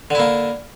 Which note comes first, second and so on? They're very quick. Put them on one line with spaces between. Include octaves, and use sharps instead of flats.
D3 E4 A#3